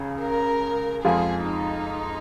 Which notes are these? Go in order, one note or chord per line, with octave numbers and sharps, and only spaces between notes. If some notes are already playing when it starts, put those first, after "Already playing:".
Already playing: C#2 C#3
A#4
F2 F3 G#3 F4 G#4
D#4